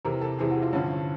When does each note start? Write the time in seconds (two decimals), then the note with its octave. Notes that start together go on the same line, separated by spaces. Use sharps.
0.05 E2 C3 E3 A#4
0.22 A4
0.39 E2 C3 E3 G#4
0.51 F#4
0.62 F4
0.73 G2 D3 F3 C#4